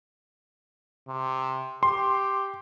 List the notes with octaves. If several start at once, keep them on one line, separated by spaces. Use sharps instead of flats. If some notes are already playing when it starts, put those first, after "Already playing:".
C3
G4 C6